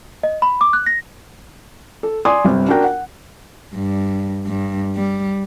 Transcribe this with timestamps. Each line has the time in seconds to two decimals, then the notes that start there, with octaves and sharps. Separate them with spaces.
0.23 D#5
0.42 B5
0.61 D6
0.73 F#6
0.87 A#6
2.03 A4
2.25 D5 G#5 C6 D#6
2.45 G1 C3 G3
2.69 D4 F#4 A#4 G5
2.84 F#5
3.74 G2
4.46 G2
4.95 G3